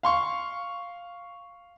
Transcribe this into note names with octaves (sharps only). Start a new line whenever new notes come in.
F5 C6 C#6